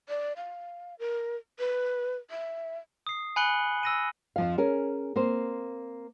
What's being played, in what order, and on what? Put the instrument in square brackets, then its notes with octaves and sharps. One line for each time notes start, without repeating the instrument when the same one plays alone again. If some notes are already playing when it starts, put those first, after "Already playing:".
[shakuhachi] D5
F5
A#4
B4
E5
[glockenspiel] D#6 C7
G#5 B5 F#6 C#7 F#7 G7
E6 A#6 D#7
[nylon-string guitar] F2 F3 F5
C#4 G#4 A#4
A#3 C4 C5